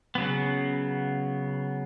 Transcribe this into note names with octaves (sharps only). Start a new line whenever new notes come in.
C#3 F#3 B3